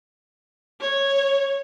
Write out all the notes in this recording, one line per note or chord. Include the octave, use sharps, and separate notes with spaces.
C#5